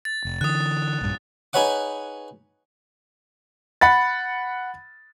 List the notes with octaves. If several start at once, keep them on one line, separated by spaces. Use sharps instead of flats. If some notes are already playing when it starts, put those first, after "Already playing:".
A6
F1
D3 E3 D#6 F#6
A#1 G2
D#4 G#4 B4 C#5 F#5 D6
F#5 B5 A6